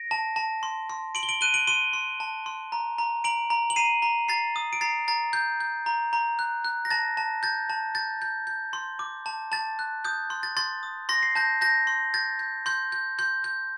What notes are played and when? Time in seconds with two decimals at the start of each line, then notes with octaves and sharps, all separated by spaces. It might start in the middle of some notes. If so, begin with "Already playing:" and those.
Already playing: A#6 D7
0.11 A5
0.36 A5
0.63 C6
0.90 C6
1.15 C6 D7 F#7
1.23 G7
1.29 D7 F#7
1.41 F#6 D#7 G7
1.54 D7 F#7
1.67 C6 D#7 G7
1.93 C6
2.20 A5
2.46 C6
2.72 A#5
2.98 A#5
3.24 A#5 D7 F#7
3.50 A#5
3.70 F#7
3.76 A#5 C7 D#7
4.02 A#5
4.28 A#5 A6 C7
4.56 D#6
4.73 D7
4.81 A#5 A6 C7
5.08 A#5 A6
5.33 G6
5.60 G6
5.86 A#5
6.13 A#5
6.39 F#6
6.65 F#6
6.85 A#6
6.90 A5 A6
7.17 A5
7.43 G6 A6
7.70 A5
7.95 G6 A6
8.22 G6
8.47 G6
8.73 C6
8.99 D6
9.26 A5
9.52 A5 A6
9.79 F#6
10.05 D#6 G6
10.30 C6
10.43 A6
10.57 C6 A6
10.83 D#6
11.09 C6 A#6
11.23 C7
11.35 A5 G6 A#6
11.61 A5 G6 A#6
11.87 C6
12.14 G6 A6
12.39 G6
12.66 C6 G6
12.92 G6
13.19 C6 G6
13.44 G6